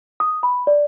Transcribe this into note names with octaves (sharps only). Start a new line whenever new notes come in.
D#6
B5
D5